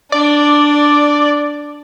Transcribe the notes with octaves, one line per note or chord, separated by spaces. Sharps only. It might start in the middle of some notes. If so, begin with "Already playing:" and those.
D4 D5